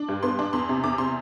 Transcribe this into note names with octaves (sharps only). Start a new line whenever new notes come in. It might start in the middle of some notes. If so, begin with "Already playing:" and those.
Already playing: D4
G2
B3 C6
D4
E2 C6
C3
E2 D6
C3 C6